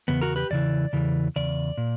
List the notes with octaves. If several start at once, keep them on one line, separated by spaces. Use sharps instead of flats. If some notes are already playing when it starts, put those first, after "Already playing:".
E2 C#3 B3
F#4 A#4
G4 B4
E2 C#3 E3 D5
E2 C#3 E3
E2 C#3 D5
A#2